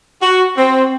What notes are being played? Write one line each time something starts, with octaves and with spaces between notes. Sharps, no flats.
F#4
C4